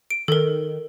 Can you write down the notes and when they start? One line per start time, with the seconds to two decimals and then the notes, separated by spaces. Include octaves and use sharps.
0.11 D7
0.28 D#3 A4 A#4